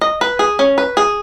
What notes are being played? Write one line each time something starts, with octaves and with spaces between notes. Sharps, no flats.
D#5
B4
G#4
C#4
B4
G#4